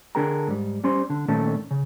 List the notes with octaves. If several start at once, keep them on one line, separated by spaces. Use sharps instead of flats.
D3 D4 G#4 A#4 G5 A#5
G#2 G3
G3 C#4 C5 C6
D3
A#2 D#3 A3 C#4 A4
C#3